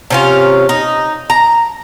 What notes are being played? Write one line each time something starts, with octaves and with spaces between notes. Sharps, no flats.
C3 C#4 F4
D#4
A#5